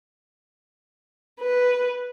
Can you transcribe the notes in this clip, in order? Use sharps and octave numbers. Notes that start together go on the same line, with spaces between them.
B4